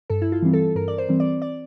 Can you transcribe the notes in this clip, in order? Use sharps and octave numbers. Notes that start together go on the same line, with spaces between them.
G2 A4
E4
F4
E3 G3 C4
A4
G2 A#4
D5
C5
E3 G3 C4
D5
D5